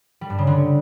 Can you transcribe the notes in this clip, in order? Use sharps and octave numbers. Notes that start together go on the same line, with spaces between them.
G3
G2
C#3
D3